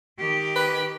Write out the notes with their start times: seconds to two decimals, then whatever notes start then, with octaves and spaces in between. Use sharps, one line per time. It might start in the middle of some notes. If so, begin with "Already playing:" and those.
0.18 D#3 G4
0.56 B4